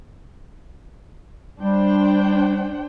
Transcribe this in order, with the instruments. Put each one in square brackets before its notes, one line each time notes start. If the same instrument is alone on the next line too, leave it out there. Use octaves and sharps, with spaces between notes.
[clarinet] G3 [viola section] D4 C5 G5